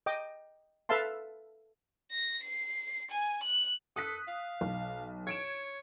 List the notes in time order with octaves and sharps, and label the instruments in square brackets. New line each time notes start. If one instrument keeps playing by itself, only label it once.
[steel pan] D#5 G5 D6
A4 B4 E5 F5 A5 C6
[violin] A#6
C7
G#5
F#6
[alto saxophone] A4 [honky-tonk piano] D#6 F#6 B6
[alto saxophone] F5
[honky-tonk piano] B1
[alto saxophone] C#5 [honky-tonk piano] G#6 D7 E7